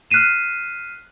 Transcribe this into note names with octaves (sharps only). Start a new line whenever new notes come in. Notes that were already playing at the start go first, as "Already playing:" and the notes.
F6 F#6 B6 C7 D#7 E7